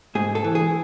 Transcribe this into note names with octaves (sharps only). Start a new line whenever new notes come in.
G#2 G#4
A4
E3
G#4